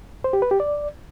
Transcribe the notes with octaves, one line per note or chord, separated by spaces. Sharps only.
C5
G4
B4
G4
D5